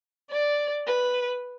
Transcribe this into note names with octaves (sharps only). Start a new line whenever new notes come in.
D5
B4